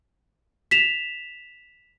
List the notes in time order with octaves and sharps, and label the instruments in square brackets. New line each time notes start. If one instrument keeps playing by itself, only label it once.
[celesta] B6 E7 F7